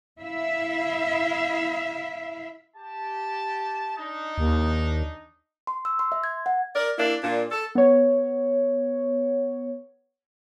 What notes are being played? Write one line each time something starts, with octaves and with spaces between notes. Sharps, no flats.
E4 E5 F5
G4 A5
D4 D#4
D#2
C6
E6
C6
E5
G#6
F#5
A#4 D5
A#3 D4 E4
A#2 D4
A4
B3 C#5